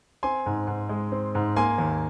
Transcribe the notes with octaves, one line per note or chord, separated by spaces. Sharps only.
C4 G#5 C6
G#2
G#2
G#3
C4
G#2
A#3 G#5 C6
D#2